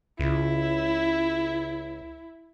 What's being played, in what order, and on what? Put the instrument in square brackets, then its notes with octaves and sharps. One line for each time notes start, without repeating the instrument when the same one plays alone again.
[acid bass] C#2 [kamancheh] E4